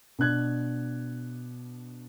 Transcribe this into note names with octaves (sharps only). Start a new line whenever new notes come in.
B2 D4 F#6 G#6